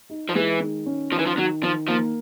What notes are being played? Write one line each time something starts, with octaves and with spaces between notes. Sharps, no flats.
D#4
F3
E3 G#3
D#3
C#4
D#3 F3
E3
F3
D#3 F#3
D#3 F3
F3 A#3